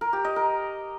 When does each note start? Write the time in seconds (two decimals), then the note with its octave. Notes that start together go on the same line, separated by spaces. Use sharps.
0.01 A#4
0.13 G4
0.25 D#5
0.36 A#4